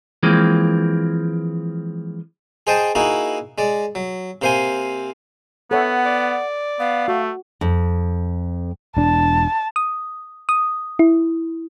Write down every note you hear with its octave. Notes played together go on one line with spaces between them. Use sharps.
E3 F3 G#3 A#3 C4
G#4 C5 D#5 G5 A5
A#3 D#4 E4 F#4 G#4
G#3 D5
F#3
C3 A#3 C5 F5 G#5 C6
B3 A4 C#5 E5 F#5
D5
B3 F5
A3 F#4
F2
E1 D4 A5
D#6
D#6
E4